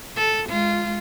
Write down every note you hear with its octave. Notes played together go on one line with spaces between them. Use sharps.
A4
G#3 F4